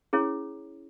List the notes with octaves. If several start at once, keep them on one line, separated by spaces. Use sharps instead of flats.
C#4 E4 G#4 C#5